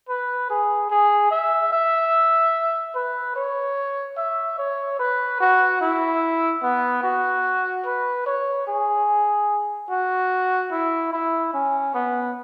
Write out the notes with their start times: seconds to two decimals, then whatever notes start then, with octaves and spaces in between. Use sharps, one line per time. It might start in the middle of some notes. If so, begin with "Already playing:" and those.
0.09 B4
0.50 G#4
0.90 G#4
1.31 E5
1.72 E5
2.95 B4
3.36 C#5
4.17 E5
4.58 C#5
4.99 B4
5.40 F#4
5.81 E4
6.63 B3
7.03 F#4
7.86 B4
8.26 C#5
8.67 G#4
9.90 F#4
10.72 E4
11.13 E4
11.54 C#4
11.94 B3